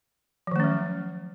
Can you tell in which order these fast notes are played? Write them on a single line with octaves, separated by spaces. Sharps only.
F3 D#3 A3 C#4 F#3